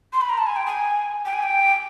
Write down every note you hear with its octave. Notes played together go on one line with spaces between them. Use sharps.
C6
B5
A#5
A5
G#5
G5
G#5
G5
G#5
G5